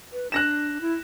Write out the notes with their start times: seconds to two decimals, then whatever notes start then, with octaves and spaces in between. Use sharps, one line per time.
0.12 B4
0.32 D4 F#6 A#6 E7
0.81 E4